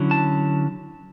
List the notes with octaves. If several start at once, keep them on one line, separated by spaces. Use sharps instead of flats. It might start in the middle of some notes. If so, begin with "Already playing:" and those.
Already playing: D3 F#3 C#4 E4
A5